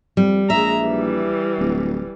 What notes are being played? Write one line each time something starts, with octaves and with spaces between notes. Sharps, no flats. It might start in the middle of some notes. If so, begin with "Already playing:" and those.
F2 G3
A#1 G#3 E5 A#5
E3 G3
D1